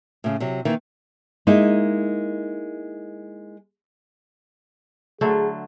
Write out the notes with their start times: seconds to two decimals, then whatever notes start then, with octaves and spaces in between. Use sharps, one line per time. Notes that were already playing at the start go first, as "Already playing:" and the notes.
0.24 A2 C#3
0.40 C3 F#3
0.65 D#3 E3 A#3
1.47 G#3 A#3 D#4 E4
5.21 D3 F#3 A3 G#4